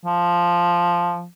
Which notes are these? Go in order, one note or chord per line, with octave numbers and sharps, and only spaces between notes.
F3